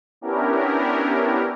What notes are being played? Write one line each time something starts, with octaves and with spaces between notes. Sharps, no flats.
B3 C#4 D4 E4 G4 A#4